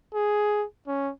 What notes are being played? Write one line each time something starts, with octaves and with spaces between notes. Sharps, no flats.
G#4
C#4